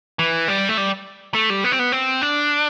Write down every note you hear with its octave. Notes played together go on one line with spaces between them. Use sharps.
E3
G3
A3
G3
A3
G3
B3
C4
B3
C4
D4